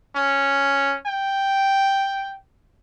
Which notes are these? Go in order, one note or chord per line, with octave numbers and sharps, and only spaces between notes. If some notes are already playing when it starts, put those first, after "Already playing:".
C#4
G5